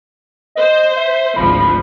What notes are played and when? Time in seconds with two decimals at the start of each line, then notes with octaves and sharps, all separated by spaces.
0.55 C5 D#5
0.96 E5
1.36 G#1 D2 F3 B5